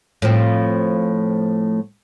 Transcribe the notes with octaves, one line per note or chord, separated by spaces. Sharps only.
A2 F3 C4